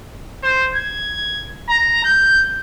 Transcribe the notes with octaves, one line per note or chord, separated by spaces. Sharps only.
C5
G#6
A#5
G6